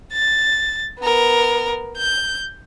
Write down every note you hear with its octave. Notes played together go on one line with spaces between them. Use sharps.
A6
B3 A#4
G6